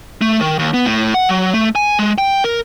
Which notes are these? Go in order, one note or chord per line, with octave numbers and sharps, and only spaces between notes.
A3
D#3
D#2
B3
A2
F#5
F#3
A3
G#5
G#3
G5
A#4